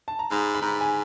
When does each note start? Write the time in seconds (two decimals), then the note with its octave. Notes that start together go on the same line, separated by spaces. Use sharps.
0.08 A5
0.19 A#5
0.31 G#2 B5
0.55 B5
0.62 G#2 A#5
0.81 G#5